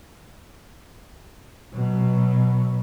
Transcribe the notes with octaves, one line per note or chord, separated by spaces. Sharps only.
B2 F#3